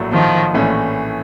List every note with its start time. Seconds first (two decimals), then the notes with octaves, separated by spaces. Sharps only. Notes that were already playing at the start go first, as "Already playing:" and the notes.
Already playing: A#1 A2 F#3 A3
0.12 D#3 F3
0.54 A#1 A2 E3 A3 C#4